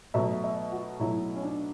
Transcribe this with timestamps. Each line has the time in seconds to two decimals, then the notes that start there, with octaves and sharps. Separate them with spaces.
0.14 B2 F#3 A3 E5
0.44 E5
0.72 F#4
1.00 B2 F#3 A3 E4
1.36 C#4
1.43 D4